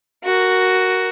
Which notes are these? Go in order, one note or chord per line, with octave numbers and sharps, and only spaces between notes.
F#4 A#4